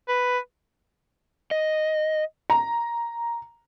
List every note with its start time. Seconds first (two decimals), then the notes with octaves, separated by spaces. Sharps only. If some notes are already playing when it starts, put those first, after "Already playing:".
0.08 B4
1.51 D#5
2.50 A#5